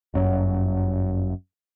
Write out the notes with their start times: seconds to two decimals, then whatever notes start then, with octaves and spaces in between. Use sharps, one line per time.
0.14 G1 F#2 F#3